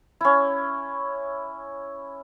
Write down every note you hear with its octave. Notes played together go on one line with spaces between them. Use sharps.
C#4 E4